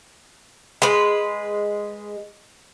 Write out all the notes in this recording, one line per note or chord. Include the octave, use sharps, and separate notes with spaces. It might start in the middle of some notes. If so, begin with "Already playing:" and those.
G#3 B4